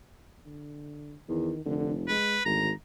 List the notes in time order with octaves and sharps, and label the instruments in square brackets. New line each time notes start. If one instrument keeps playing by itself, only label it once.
[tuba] D3
[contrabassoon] E2 [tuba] D#3
[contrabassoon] F1 [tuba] D3
[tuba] G#3 [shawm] B4
[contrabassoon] G#1 [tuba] D2 [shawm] A#5